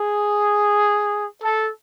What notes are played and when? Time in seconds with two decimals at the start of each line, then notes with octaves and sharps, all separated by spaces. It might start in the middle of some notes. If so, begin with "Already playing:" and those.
Already playing: G#4
1.42 A4